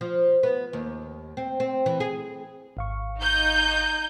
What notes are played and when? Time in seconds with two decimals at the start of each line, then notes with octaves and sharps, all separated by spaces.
0.01 F3
0.43 B3
0.73 D#2
1.37 C4
1.60 C4
1.86 E3
2.00 G#4
2.77 G#1 F5 C#6
3.19 D#4 G6